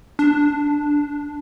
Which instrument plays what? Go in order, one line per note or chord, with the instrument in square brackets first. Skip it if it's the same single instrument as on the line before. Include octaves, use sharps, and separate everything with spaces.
[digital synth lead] D4